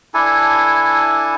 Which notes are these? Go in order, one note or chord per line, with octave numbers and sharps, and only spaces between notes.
D4 E4 A4 G#5